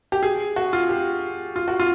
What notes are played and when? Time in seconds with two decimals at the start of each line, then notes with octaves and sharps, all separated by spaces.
0.12 G4
0.23 G#4
0.56 F#4
0.73 F4
0.89 G4
1.56 F4
1.68 F#4
1.80 F4